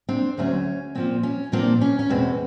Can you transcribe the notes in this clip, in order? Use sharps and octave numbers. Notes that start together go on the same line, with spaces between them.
C4 D4
D2 D3 F#3 A3 C4 C#4
A#2 F3 A#3 C4
C#4
A#2 F3 A#3 C4 D4
C#4
C#4
E2 B2 G#3 C4